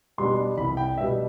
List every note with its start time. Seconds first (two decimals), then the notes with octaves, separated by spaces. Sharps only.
0.18 B2 G3 B3 D4 C6
0.57 C2 B5
0.77 G5
0.97 B2 G3 B3 D4 E5